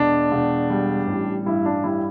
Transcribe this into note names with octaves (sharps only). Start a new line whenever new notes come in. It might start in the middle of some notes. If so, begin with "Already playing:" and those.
Already playing: E1 D4
E1
G3
A1
G2 E4
D4
G3 E4